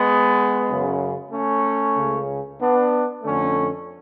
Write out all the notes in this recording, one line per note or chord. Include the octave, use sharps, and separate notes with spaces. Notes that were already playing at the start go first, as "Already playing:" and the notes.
Already playing: G#3 B3
F#2 C#3
A3 C#4
C#2 C#3
B3 D4
F2 D3 A3 C#4